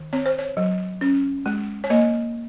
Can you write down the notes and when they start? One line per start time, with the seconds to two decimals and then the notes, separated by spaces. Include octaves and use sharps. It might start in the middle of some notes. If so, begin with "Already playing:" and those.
Already playing: D#3
0.13 C4 C#5
0.26 C5
0.39 C#5
0.57 F#3
1.01 C#4
1.46 G#3
1.84 C#5
1.90 A#3 D#5